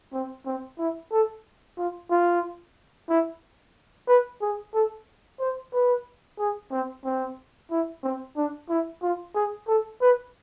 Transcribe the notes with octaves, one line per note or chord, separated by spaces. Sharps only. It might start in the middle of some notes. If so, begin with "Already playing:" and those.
C4
C4
E4
A4
F4
F4
E4
B4
G#4
A4
C5
B4
G#4
C4
C4
E4
C4
D4
E4
F4
G#4
A4
B4